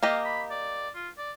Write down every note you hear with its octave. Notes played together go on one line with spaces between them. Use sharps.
A#3 G4 D#5 F5
B5
D5
F4
D5